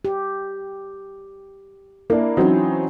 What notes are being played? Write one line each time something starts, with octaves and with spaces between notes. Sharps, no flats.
G4
A#3 D4 E4
E3 F#3 C4 C#4 D#4